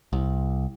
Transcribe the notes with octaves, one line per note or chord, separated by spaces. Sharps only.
C2